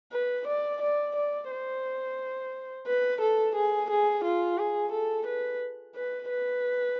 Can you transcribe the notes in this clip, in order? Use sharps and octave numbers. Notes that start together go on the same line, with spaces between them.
B4
D5
D5
D5
C5
B4
A4
G#4
G#4
F4
G#4
A4
B4
B4
B4